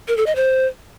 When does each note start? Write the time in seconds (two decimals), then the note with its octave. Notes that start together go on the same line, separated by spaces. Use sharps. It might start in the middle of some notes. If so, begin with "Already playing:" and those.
0.08 A#4
0.17 A4
0.26 D#5
0.36 C5